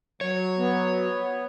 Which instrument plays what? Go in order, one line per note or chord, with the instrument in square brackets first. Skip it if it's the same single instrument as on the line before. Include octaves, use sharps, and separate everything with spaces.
[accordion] F#3 [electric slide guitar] C#5
[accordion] B3